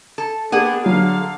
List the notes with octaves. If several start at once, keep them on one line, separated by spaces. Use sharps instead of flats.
A4
A#3 B3 D4 G4 G#4 F#5
D3 F#3 F5